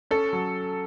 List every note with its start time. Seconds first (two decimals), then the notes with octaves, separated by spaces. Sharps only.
0.11 C#4 A4
0.33 F#3